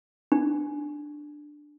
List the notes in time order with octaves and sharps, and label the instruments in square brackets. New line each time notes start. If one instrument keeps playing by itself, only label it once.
[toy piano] D4